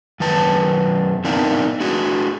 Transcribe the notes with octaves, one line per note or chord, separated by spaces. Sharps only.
F#2 D#3 B4 A5
B3 C4 D4 D#4 A#4 F5
D4 F#4 G#4